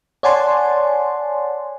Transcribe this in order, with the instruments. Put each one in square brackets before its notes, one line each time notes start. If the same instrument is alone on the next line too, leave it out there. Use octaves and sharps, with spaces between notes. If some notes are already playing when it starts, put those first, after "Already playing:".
[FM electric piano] C#5 D5 F#5 G#5 A5 C6